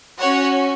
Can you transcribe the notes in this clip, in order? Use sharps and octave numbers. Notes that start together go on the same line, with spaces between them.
C#4 F#4 C#5 F#5